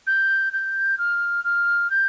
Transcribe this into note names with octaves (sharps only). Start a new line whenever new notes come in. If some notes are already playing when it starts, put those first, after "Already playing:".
G6
G6
F6
F6
G6